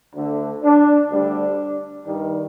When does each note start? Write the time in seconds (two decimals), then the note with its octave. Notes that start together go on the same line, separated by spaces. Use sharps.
0.14 D2 D3 A3 D4
0.63 D4
1.10 D2 D3 G3 D4
2.05 G2 D#3 G3 D4